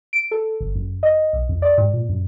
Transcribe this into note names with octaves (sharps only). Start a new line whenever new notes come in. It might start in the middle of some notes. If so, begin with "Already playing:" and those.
D7
A4
G1
F#2
D#5
B1
F2
D5
G#2
A#2
F#2